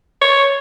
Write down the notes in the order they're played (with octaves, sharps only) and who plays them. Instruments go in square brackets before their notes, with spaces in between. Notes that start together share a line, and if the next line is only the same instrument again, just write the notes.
[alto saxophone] C#5